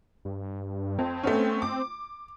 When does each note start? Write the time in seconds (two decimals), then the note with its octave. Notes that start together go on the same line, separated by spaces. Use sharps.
0.25 G2
0.99 F2 C4
1.23 A3 B3 C#4
1.62 D6